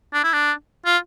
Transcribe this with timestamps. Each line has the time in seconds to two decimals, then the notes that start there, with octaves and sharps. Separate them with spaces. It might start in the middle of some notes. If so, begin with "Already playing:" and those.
0.14 D4
0.24 E4
0.33 D4
0.85 F4